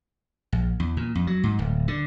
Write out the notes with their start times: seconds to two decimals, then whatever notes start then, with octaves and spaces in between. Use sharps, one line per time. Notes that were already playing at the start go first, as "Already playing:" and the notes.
0.52 A#1
0.80 E2
0.97 A#2
1.15 F2
1.27 F#3
1.44 G#2
1.59 D1
1.88 D3